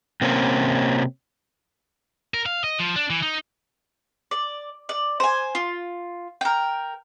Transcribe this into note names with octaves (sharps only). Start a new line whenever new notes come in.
C3 A#3 C4 C#4
A#4
F5
D#5
F3
D4
E3
D#4
D5
D5
C5 G#5
F4
A#4 G5